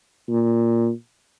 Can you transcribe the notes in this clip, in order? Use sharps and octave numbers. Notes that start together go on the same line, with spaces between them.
A#2